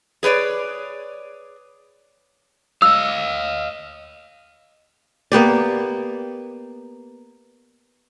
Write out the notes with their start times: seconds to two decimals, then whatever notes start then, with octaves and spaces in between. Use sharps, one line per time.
0.23 G#4 B4 C#5 D5
2.82 D#5 F5 E6
5.32 A#3 B3 G4 D5